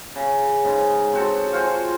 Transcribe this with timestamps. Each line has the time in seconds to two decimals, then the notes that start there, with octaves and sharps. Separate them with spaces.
0.15 C#3
0.64 G#2 C#3
1.13 C4 F#4 A4
1.53 F4 F#4 C5 G#5